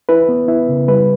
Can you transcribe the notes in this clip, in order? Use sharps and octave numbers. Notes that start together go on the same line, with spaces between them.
E4 B4
B3
E4
C#3
G3 B4